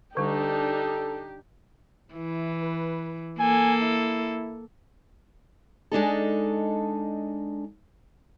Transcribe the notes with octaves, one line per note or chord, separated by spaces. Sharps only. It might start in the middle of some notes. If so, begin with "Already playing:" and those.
D3 G3 D4 D#4 G4 A4
E3 E4
B4
A#3 A4 G#5
E4
G#3 D4 D#4 A4